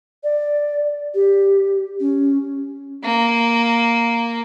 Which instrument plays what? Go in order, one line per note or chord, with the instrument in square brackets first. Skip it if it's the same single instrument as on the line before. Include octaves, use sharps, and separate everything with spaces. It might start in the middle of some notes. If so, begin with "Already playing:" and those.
[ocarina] D5
G4
C#4
[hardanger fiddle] A#3